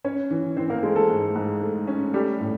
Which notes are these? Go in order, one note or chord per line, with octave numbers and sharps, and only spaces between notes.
C#4 C#5
E3
E3 C4 C5
A#3 A#4
G#3 A3 G#4
A3 A4
G#2
G#2
A3
C#4
G3 A3 G4
A2